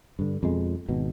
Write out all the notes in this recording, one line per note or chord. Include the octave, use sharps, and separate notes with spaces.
G2 D3
F2 B2 G#3
G#1 B2